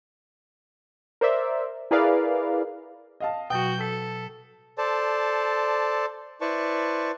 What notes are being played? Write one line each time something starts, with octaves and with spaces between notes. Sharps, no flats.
A#4 C5 D5 E5
E4 G#4 A#4 B4 D5 F5
D#5 F5 A5
B2 F#3 F#4 G5 G6
A4 B6
A4 C5 D5 A5
E4 B4 C5 D5 A5 C#6